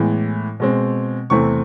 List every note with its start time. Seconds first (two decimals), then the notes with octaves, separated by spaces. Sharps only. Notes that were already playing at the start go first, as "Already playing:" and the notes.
Already playing: A2 E3 G#3 B3
0.60 B2 G#3 C4
1.30 E2 C3 E3 A3 C4 C#6